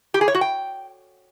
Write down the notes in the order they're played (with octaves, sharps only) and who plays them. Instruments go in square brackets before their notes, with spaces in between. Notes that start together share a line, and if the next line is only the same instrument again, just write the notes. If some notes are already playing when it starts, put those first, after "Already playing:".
[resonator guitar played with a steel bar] G4
G#4
C#5
F#4
G5